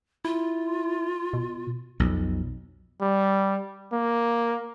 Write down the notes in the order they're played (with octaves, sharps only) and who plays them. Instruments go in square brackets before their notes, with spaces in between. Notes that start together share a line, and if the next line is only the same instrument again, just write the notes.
[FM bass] E4 [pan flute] F4
[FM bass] B2
[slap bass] B1 F2
[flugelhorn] G3
A#3